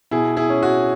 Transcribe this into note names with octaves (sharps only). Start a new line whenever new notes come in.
B2 E4 G#4
E4 G#4
C#4
F#4